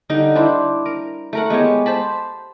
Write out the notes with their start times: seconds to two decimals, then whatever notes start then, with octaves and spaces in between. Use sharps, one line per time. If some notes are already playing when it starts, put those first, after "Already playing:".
0.09 D3 G3 D#4
0.35 D4 E4 C5
0.86 A#4
1.33 A3 A#4 F#5
1.50 G#3 B3 G4 C#5
1.86 C5 A5 B5